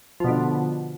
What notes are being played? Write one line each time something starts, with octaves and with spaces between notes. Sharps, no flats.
B2 D3 F3